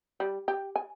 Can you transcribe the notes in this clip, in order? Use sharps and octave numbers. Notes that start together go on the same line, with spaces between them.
G3
G4
G#5